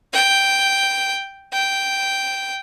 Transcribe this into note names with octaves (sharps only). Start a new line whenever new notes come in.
G5
G5